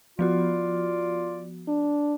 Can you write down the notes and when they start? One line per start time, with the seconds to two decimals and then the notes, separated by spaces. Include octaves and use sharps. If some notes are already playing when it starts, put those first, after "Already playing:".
0.19 F3 B3 F4 F#4 D5
1.68 D4